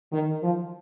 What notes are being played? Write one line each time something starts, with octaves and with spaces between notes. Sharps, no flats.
D#3
F3